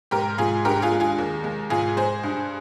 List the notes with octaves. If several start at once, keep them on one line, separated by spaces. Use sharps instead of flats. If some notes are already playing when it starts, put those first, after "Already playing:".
G#2 G4 A#4
G#2 F4 G#4
G2 G4 A#4
F4 G#4
G#3
F4 G#4
D#2
G#3
G#2 F4 G#4
G#3 G#4 C5
G2